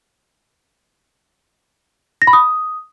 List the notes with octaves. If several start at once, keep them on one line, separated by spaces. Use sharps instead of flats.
A#6
B5
D#6